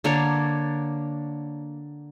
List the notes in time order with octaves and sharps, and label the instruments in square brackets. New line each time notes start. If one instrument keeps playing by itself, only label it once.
[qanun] D3 A#3 D4 C#5